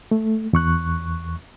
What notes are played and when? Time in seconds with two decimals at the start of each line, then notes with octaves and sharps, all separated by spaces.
0.11 A3
0.53 E2 C#6 F#6